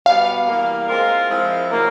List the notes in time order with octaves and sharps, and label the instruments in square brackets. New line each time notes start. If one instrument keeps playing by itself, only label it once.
[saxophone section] B2 G3 B3 [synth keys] F5
[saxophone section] E3 G3 A#3
G#3 C4 F4 A#4
F3 G#3 C4 E4
C#3 F#3 A#3